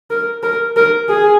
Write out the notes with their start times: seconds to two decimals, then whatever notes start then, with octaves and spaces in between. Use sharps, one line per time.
0.11 A#4
0.43 A#4
0.76 A#4
1.09 G#4